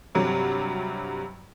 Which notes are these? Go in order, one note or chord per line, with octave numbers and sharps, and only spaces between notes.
G2 C3 F#3